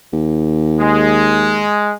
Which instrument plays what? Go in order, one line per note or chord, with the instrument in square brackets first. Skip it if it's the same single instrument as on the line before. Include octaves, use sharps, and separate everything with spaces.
[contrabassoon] D#2
[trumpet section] G#3